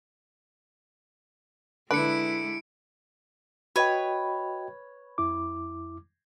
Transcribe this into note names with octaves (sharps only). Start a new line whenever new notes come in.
D3 G#3 E4 B4 C#7 D7
F#4 B4 C#5 D#5 G5
F2 E4 D6